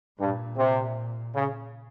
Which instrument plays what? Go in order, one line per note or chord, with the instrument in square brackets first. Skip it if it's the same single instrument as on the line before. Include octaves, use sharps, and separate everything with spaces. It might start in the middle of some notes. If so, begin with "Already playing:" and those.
[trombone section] G2 [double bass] A#2
[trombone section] C3
C#3